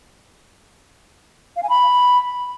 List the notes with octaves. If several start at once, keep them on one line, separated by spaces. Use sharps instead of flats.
F5
G#5
B5